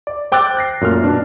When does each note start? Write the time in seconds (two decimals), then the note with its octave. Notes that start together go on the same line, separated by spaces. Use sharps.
0.07 D5
0.32 C5 G5 D6 E6 F#6 A6
0.57 F#6 A#6 C7
0.81 F#2 A#2 A3 F6
1.03 B2 D4